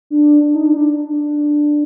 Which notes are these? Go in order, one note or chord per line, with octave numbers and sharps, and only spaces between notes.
D4
D4
D#4
D4
D#4
D4
D4